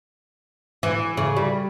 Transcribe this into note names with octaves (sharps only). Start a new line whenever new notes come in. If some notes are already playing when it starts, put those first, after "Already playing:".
E3
C#3
G3